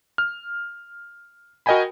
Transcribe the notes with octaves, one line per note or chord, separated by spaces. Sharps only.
F6
F#4 A#4 D#5 G5 G#5 B5